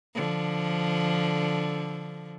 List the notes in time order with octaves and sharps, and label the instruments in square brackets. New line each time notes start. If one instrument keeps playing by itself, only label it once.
[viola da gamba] D3 F3